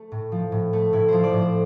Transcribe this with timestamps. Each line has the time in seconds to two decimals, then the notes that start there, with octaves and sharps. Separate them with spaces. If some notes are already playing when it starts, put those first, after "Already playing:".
Already playing: A3
0.12 A2
0.32 F3
0.52 A2
0.73 A3
0.93 A2 E4
1.08 F3 C5
1.23 D5
1.33 A2
1.39 C5